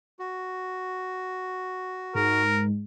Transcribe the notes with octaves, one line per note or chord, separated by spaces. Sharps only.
F#4
G#2 A#4